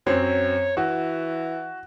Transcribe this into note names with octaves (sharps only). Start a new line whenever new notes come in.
F#2 F#3 C4 C#5
E3 F#4